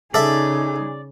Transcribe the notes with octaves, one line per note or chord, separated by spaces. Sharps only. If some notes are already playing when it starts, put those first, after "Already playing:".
C#3 D#4 G#4 A4 D5 E5